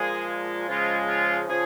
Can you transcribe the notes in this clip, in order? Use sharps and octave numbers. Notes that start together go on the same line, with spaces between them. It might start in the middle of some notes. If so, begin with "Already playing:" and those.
Already playing: A#2 F3 G#3 G#4
C#3 F3 G#3 F4
F4
C#3 F3 G#4